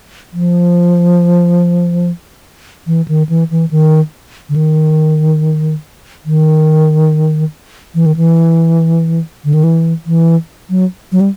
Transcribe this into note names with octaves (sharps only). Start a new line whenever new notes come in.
F3
E3
D#3
E3
E3
D#3
D3
D#3
D#3
E3
D#3
E3
D3
D#3
E3
E3
F#3
F#3
G3